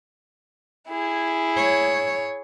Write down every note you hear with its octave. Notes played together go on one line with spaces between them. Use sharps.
E4 G#4
C#5